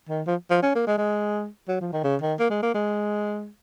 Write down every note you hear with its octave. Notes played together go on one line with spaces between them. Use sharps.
D#3
F3
F3
C#4
A#3
G#3
G#3
F#3
F3
D#3
C#3
D#3
A#3
G#3
A#3
G#3